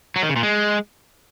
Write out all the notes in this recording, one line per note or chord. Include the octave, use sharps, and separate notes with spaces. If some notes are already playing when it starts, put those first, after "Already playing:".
F#3
D#3
C#3
A#2
G#3